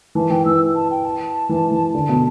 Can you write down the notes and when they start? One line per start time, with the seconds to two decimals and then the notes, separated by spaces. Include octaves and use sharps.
0.15 E3 A5
0.30 E3 G5
0.45 E3 E6
0.75 A5
0.90 G5
1.05 A5
1.49 E3
1.72 E3
1.95 D3
2.09 B2